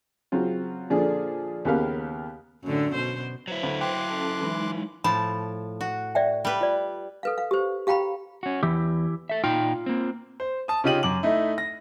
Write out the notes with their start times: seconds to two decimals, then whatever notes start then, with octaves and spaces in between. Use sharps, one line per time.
0.32 C#3 F#3 C4 F4
0.90 A#2 D3 F3 D4 G#4
1.65 D#2 C#3 B3 G4 A#4 F5
2.63 F#2 A2 D3
2.93 B2 C5
3.48 F#3 E4 B4 C5
3.63 D2
3.81 G5 C6 D6 F#6
4.08 C#4 A4 A5
4.41 E3 G#3 D#4
5.04 A2 F3 A5 B5
5.81 F#4
6.15 D5 E5 G5
6.45 G3 B4
6.61 F4 D5
7.23 A4 B4 F5
7.38 F5
7.51 G4 C5
7.87 G4 F5 G5 A#5 B5
8.43 C#4 F#4
8.63 E2 E3 E4 G4
9.29 A4 E5
9.44 A#2 D#4 F4 G5
9.86 A#3 C4
10.40 C5
10.68 A5 D#6
10.84 C#3 D#4 F4 G4 D#7 F#7
11.03 F#2 D6 F#7
11.23 A3 D#4 E4
11.58 A#6